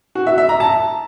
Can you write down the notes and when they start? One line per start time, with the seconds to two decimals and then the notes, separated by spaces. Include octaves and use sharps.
0.15 F#4
0.27 E5
0.38 E5
0.49 A#5
0.60 A5